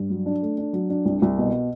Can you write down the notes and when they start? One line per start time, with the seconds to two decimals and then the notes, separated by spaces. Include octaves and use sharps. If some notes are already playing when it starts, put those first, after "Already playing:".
Already playing: G2
0.10 F#3
0.26 D4
0.42 A3
0.58 D4
0.73 F#3
0.89 D4
1.05 C2
1.22 C2
1.38 B2